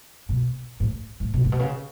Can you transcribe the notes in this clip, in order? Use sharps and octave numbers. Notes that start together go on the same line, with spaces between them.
B2
A2
A2
B2
A2
B2
C#3